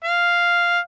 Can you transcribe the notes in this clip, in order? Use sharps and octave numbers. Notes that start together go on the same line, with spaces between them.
F5